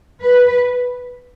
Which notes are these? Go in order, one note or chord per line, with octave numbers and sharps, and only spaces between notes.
B4